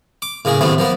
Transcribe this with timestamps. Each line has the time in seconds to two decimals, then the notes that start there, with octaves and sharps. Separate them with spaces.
0.22 D6
0.45 A2 C#3 A#3 G#4
0.61 D#2 A2 A3 B3 C4
0.78 F3 A#3 B3